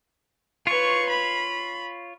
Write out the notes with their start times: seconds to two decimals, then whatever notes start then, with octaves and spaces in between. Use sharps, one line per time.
0.67 F4 B4 C#5 C#6
1.10 B5